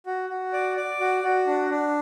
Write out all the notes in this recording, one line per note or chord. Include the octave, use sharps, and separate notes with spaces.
F#4
F#4
D5
D5
F#4
F#4
D4
D4